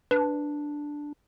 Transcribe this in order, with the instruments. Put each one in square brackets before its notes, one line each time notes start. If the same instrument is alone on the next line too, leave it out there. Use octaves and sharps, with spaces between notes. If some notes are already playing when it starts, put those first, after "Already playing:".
[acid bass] D4 [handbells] B4